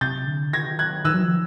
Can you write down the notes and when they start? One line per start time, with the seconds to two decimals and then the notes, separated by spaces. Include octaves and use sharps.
0.01 C3 G6 A6
0.27 D3
0.53 D#3 G#6 A#6
0.79 F#6 G#6
1.05 D#3 E6 F#6
1.14 F#3
1.22 F3